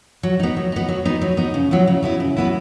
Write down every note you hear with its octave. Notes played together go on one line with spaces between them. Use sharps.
F#3
B3 D#4
F#3
B3 D#4
F#3
B3 D#4
F#3
B3 D#4
C#3
F#3 B3 E4
C#3
F#3 B3 E4
C#3
F#3 B3 E4